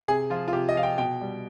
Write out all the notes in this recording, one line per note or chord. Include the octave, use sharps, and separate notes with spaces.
C3 G#4
F3 F4
F4
C3 G4
D#5
F3 F5
G5
B2 G5
G3